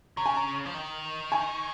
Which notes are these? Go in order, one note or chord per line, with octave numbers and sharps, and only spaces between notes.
C#3 A#5
G#5
A#5
F3
D#3
G#5